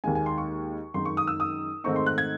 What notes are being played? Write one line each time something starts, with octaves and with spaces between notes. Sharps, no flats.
D#2 D#3 G#3 G#5
G#5
C6
C#6
F#2 D#3 G#3 D#4 C6
C#6
D#6
E6
D#6
G#2 D#3 A3 C4 D#4 C#6
C6
F#6
G#6